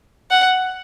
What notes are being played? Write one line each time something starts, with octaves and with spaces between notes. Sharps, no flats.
F#5